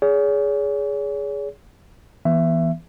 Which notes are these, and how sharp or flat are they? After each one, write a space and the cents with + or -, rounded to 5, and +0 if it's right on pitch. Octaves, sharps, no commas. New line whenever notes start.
G#4 +0 C#5 +45
E3 +0 B3 -25 E5 +20